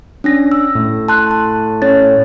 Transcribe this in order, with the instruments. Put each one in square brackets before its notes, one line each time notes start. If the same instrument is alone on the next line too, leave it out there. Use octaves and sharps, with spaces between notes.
[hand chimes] C#4 D4 A#6
E6
[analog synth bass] A2
[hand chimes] A5 C6 F#6
A5
C#4 C#5 A6